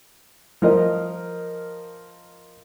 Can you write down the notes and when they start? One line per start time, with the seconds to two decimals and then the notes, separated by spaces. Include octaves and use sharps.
0.62 F3 A#4 D#5